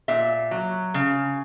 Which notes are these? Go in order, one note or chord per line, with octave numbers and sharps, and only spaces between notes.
A#2 E5
F#3
C#3